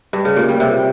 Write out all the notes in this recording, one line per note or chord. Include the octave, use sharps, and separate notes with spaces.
G2
C#3
A#2
G3
C3